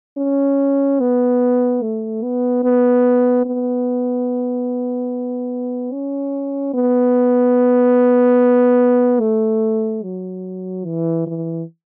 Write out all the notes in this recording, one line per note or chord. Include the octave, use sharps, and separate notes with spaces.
C#4
B3
A3
B3
B3
B3
C#4
B3
A3
F#3
E3
E3